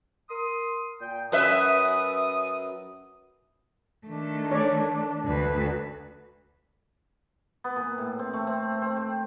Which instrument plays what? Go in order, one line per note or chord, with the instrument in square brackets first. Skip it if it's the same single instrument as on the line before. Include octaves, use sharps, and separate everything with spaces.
[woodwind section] A#4 C6 D#6
A#2 G5
[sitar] F#2 B4 E5 [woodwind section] D#6
[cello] D#3 A3 [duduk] D4
[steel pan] C#5 D5
[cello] D2 B4
[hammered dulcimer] B3
A#2
A2
C4
A3
C4
C4
G5